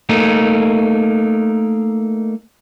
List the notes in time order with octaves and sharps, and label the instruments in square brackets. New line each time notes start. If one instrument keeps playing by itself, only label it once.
[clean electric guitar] A3 A#3 D#4